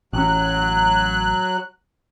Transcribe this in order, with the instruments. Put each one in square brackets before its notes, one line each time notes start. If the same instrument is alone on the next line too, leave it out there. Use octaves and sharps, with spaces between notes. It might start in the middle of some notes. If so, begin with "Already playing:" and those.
[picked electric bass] A1 C#4 [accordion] F#3 F#6